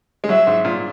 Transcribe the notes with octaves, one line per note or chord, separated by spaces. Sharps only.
G#3
F#3 E5
G#2
A#2